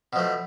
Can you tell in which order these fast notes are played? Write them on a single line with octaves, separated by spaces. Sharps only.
B2 F3 A3